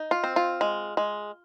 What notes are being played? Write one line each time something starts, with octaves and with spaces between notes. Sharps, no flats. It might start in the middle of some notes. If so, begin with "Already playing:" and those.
Already playing: D#4
F4
C4
F4
G#3
G#3